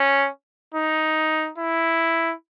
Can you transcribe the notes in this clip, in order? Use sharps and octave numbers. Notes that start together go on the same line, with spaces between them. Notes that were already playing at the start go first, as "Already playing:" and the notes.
Already playing: C#4
D#4
E4